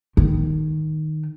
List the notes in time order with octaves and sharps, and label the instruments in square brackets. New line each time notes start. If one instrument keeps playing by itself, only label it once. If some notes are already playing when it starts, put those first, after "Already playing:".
[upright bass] D#3